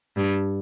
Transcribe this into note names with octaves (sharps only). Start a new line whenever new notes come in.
G2